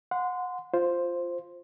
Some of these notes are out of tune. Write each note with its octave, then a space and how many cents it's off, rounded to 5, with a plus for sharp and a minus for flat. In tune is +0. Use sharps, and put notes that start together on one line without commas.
F#5 -30 C6 -20
F4 +0 C5 +0